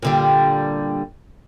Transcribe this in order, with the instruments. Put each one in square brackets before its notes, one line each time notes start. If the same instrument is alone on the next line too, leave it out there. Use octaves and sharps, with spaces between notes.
[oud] A#2 D3 G3